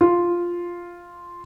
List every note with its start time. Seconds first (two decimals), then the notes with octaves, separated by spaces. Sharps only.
0.01 F4